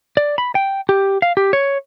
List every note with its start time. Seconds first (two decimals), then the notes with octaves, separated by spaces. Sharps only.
0.17 D5
0.38 B5
0.55 G5
0.89 G4
1.22 F5
1.37 G4
1.53 C#5